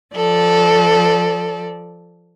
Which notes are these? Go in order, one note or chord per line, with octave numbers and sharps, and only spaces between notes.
F3 A4 D5